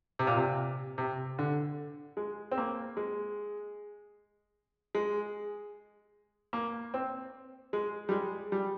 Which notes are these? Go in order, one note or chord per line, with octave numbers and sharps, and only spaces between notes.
C3
A#2
C3
C3
D3
G#3
C4
A#3
G#3
G#3
A#3
C4
G#3
G3
G#3
G3